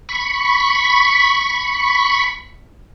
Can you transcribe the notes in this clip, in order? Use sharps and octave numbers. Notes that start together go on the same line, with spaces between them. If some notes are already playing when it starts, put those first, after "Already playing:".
B5 C#6